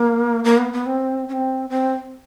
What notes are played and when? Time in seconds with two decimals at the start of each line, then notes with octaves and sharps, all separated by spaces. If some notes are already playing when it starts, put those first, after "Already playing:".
Already playing: A#3
0.44 A#3
0.58 B3
0.73 B3
0.86 C4
1.28 C#4
1.33 C4
1.70 C4